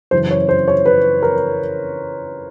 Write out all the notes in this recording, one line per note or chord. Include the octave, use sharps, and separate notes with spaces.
F#2 C#3 E3 C5
C#5
C5
C#5
B4
A#4